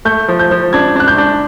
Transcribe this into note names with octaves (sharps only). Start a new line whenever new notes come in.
A3 G6
F3
G6
F3
D4 G#6
D4 F#6
G6
D4